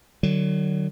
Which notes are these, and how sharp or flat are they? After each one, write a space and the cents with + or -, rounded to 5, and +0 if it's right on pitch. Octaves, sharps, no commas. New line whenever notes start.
D3 +45 F#3 +25